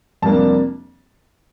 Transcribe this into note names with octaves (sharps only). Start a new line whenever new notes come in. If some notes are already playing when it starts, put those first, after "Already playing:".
F2 C3 G3 A#3 D4 A5